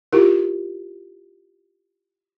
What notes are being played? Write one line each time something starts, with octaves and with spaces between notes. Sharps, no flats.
E4 F4 G4 A#4